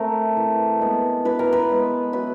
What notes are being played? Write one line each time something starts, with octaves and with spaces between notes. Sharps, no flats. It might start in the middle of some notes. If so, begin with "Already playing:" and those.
Already playing: A3 C4 A#4
E3
G#3 B3
E3 B4
A#4
B4
G#3 B3
F#3 B4